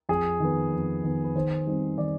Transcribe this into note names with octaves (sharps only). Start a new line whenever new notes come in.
F2 G#4
D#3 B3
F2
D#3 B3
B4
D#3 C5
G3 C4 D#4
D#3 D5